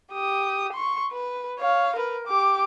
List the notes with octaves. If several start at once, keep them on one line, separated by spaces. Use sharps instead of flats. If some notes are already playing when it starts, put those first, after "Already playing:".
G4 D#6
C6 C#6
B4
C#5 F5
A#4 B4
G4 D6